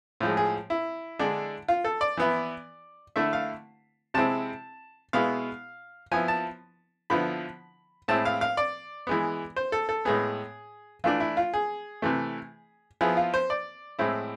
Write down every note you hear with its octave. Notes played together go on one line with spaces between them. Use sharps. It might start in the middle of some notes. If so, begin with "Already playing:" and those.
A2 F3 G#3
G#4
E4
D3 G#3 D4
F4
A4
D5
E3 B3 E4
D3 A3 E4 E5
F5
C3 G#3 C4 E4 A5
B2 G#3 B3 E4 F5
F3 B3 E4 G#5
A5
D3 F3 B3 E4 B5
A2 G#3 C4 E4 A5
F5
F5
D5
E3 G#3 B3
C5
A4
A4
A2 G#3 B3 G#4
E3 A3 D4 F4
E4
F4
G#4
C3 E3 A3
F3 B3 E4 G#4
F4
C5
D5
A2 G#3 C4 E4